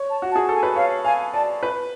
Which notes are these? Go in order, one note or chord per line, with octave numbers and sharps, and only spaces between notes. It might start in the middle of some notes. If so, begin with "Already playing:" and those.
Already playing: C#5
A5
F#4
A5
G#4
A4
G#5
B4
C#5 F5
F5 G#5
D5 A5
B4